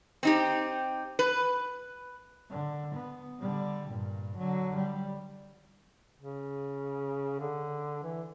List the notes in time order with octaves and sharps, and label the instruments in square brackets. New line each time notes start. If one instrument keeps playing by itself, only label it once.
[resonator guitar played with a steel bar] C4 D#4 G4
B4
[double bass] D3
B3
D3 G3
G2 A#2
D3 F#3
G3
[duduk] C#3
D3
E3